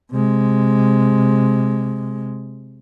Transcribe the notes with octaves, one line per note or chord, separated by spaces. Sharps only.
C3 G#3